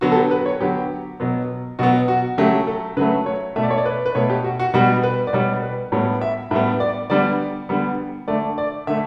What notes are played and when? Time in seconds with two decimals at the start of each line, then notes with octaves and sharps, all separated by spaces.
0.01 D3 F#3 B3 F#4
0.12 A4
0.16 G4
0.31 B4
0.46 C#5
0.61 D3 F#3 B3 G4
1.20 B2 F#3 B3
1.79 B2 F#3 B3 F#4
2.08 F#4
2.38 C#3 F#3 A3 G4
2.67 A4
2.97 C#3 F#3 A3 B4
3.26 C#5
3.56 B2 A3 E5
3.63 D5
3.70 C#5
3.78 D5
3.85 B4
4.06 B4
4.15 B2 A3 C#5
4.30 G4
4.44 F#4
4.60 F#4
4.74 B2 G3 B3 F#4
5.03 B4
5.27 D5
5.33 B2 G3 B3 C#5
5.62 B4
5.92 A2 G3 B3 C#5
6.21 E5
6.51 A2 G3 B3 E5
6.80 D5
7.10 D3 G3 B3 D5
7.69 D3 G3 B3
8.28 D3 A3 D5
8.58 D5
8.87 D3 A3 E5